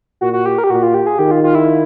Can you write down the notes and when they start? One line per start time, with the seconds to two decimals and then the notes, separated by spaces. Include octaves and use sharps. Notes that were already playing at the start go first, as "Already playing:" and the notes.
0.21 A#2 F#4
0.33 F#4
0.46 G4
0.58 A#4
0.64 G4
0.70 A#2 F#4
0.83 F4
0.94 G4
1.07 G#4
1.19 D#3 G4
1.31 F4
1.44 F4
1.55 E4